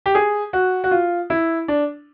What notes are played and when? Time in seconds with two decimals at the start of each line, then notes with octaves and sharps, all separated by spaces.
0.06 G4
0.15 G#4
0.53 F#4
0.84 F#4
0.91 F4
1.30 E4
1.68 D4